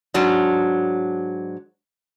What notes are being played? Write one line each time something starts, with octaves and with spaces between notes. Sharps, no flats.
G#2 F#3 D4